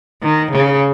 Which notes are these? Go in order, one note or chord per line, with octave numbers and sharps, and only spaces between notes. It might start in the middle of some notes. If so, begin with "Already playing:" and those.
D#3
C#3